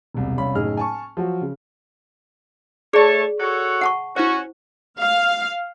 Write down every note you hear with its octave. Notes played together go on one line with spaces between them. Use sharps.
E1 C2
C2 C#4 F5 B5
F#1 A2 D#4 G#4 F6
G#5 A5 C#6
F3 F#3 F#4
C#3
A3 G#4 C#5 D5 A5
F#4 A4 C#5
F#5 A5 C#6
C#4 E4 F#4 C5
F5